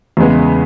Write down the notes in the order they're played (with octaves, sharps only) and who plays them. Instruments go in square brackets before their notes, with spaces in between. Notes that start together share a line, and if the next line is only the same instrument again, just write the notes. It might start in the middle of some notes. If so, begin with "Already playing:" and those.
[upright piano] E2 C#3 E3 G#3 B3